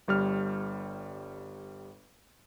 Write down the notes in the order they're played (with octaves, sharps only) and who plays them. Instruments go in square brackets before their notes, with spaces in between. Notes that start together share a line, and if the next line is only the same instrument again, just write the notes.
[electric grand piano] G1 G3 F6